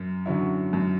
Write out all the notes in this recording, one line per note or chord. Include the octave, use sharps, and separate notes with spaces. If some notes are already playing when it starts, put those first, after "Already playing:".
Already playing: F#2
D3 F#3 C#4 E4
F#2